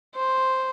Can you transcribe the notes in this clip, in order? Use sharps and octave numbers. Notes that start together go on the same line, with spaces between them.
C5